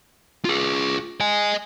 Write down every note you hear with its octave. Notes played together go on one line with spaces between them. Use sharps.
F4 G#4
D#5 G#5